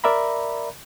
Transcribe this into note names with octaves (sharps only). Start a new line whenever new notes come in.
A#4 D5 E5 A#5 B5